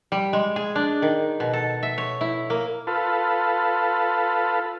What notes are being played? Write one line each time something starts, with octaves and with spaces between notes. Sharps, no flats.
G3
G#3
G#4
D4
D#3
B2
A4
E5
C#5
E4
A#3
F4 A4 B4